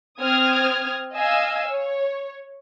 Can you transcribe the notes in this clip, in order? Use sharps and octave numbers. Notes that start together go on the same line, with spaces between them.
C4 D#6 F6 G#6
D#5 F5 G#5 E6
C#5